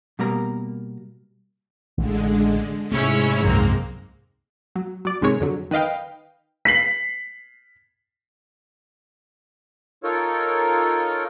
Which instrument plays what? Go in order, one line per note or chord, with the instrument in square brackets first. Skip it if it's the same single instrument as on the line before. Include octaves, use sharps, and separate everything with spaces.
[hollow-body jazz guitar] B2 G3 A#3 A#5
[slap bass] A1 E3 [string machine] D3 G#3
[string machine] G#2 G#3 [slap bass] C3 A3 [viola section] C#4 E4 C#5
[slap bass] C2 F#2 F3 [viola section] A#3 C4
[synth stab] F#3
F#3 D5
G#1 G#2 C3 D#3 G#3 C#5
F2 D3 F#3
D#3 B4 D#5 F5 G5
[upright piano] B6 C7 F#7
[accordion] D#4 F4 A4 A#4 C#5